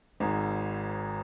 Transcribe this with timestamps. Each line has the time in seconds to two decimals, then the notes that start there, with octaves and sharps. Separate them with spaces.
0.20 G#1 G#2